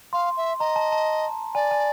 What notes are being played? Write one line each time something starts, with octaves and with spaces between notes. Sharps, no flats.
F5 C6
E5
D#5 A#5
A5
A5
D5 G#5
G#5